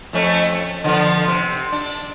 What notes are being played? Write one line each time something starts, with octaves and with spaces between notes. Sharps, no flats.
F2 A3 C#4
D3 F3 B3
C3
D4